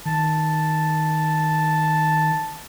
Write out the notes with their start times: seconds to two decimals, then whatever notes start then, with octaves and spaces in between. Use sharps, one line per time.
0.05 D#3 A5